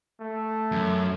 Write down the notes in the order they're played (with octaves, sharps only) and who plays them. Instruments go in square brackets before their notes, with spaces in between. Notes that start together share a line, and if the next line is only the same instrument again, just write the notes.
[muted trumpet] A3
[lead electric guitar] F#2